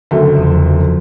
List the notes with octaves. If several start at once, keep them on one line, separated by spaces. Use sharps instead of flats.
F#1 D2 A3
E2 F3